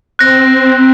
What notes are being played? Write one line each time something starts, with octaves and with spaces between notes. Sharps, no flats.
C4 F#6 A#6